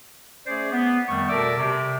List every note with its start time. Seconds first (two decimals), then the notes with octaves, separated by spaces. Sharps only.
0.47 A3 C#4 G#4 C5 D5
0.71 B3
1.09 F2 D#3 G3 A3 C#6
1.29 B2 A4 A#4 D5 E5 D6
1.58 C3